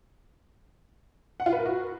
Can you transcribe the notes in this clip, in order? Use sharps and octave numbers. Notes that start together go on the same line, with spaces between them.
F#5
F4
B4
A#4
F#4